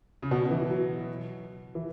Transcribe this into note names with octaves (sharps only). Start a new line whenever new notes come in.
C#3
B2
E3
F#3
E3